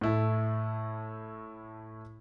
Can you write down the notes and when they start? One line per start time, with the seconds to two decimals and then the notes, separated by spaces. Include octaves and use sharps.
0.01 A2 E4 A4